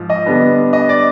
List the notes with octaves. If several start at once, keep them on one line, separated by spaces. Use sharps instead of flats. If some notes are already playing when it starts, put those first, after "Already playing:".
Already playing: G#2 F3
D#5
D3 G3 B3 D4
D#5
D5